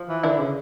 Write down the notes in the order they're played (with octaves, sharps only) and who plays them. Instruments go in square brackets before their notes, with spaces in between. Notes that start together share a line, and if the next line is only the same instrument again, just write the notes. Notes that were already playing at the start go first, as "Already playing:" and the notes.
Already playing: [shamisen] F3
[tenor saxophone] E3
[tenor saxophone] D3 [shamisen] E3 E4
[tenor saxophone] C#3